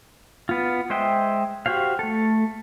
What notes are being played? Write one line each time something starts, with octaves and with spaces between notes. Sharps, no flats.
B3 F4
G#3 C5 D#5 E5 G5
F#4 G4 C5 F5
A3 A4